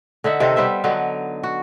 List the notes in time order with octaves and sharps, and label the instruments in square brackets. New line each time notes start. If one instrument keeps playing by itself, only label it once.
[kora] D3 D#4 E5 F#5
C3 D#3 A4 C5
G3 B3 C5 E5
D3 F#3 B3 D#4
F#4